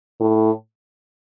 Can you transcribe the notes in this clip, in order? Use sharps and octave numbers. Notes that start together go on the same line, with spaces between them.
A2